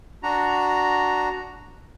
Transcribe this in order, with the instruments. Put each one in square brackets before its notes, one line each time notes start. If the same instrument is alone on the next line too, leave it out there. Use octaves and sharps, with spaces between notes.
[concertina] D4 F#4 A#5